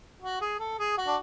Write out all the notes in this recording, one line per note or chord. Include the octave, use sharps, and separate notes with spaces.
F#4
G#4
A4
G#4
F#4
D4